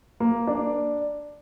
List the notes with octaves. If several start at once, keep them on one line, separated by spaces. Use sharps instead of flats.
A#3
D4